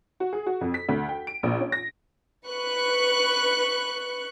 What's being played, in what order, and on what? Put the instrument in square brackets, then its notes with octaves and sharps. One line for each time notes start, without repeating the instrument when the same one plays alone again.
[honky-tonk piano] F#4
G#4
F#4
F2
B6
D2
G5
D7
A#1
C#4
A#6
[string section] B4 C#6 F#6